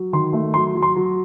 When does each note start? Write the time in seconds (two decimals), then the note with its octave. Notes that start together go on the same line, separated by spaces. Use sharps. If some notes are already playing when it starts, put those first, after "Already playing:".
Already playing: F#3
0.13 D#3 C6
0.33 A3
0.54 F#3 C6
0.75 F#3
0.82 C6
0.96 F#3